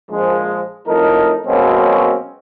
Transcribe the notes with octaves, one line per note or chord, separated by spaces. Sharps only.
A#1 F3 G#3
F2 A2 D#4 A4 A#4
B2 F#3 G#3 A#3 C4 C#4